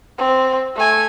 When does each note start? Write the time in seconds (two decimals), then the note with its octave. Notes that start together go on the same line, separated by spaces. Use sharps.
0.18 C4
0.76 A3 G#5